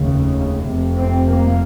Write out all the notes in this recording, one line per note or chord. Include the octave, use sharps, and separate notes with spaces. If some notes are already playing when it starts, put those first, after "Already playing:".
Already playing: F1 D#2 C#3
F1 F2 C3
C4
A#3